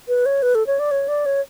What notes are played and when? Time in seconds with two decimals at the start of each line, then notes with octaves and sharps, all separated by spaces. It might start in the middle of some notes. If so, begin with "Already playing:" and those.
0.08 B4
0.26 C#5
0.42 B4
0.55 A4
0.67 C#5
0.79 D5
0.91 C#5
1.08 D5
1.26 C#5